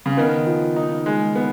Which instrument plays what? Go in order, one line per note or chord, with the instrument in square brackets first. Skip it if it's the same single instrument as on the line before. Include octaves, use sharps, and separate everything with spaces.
[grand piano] C#3
[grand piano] D#3 [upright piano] B3
[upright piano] F3
D#4
G#3
B3